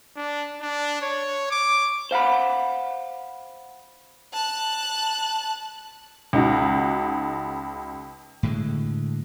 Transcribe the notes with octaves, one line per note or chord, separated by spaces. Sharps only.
D4
D4
C#5
D6
C5 F5 F#5 B5
A5 F#6
C#2 D#4 F#4
A2 D3 G#3